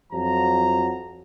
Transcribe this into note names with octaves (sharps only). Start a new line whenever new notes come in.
F2 F3 F#3 A#5